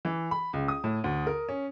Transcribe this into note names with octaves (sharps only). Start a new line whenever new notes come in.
E3
B5
C#2
D#6
A2
D2
A#4
C#4